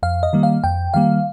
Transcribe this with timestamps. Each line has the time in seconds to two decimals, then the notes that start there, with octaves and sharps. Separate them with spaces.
0.03 F2 F5
0.23 D#5
0.33 D#3 G3 A#3
0.43 F5
0.64 F2 G5
0.94 D#3 G3 A#3 F5